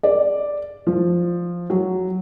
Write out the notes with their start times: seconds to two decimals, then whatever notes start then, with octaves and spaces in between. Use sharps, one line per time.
0.03 D5
0.87 F3
1.70 F#3